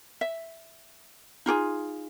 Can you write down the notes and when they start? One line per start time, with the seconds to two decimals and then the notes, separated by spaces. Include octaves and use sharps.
0.21 E5
1.46 D#4 F4 G4 G#4